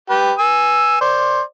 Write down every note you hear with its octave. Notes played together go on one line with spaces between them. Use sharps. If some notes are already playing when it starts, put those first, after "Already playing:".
G4 B4
G#5 E6
C5 D5